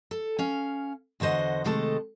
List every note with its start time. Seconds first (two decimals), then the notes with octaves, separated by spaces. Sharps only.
0.11 A4
0.39 C#4 F5
1.20 E2 D3 F#4 C5 D#5
1.64 C3 D#3 G#3 A3 A4